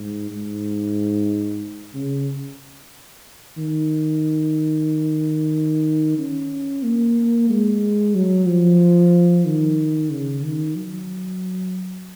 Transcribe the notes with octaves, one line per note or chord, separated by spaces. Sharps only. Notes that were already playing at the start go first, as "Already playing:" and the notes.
Already playing: G#2
G#2
C#3
D#3
C#4
A#3
G#3
F#3
F3
D#3
C#3
D#3
F#3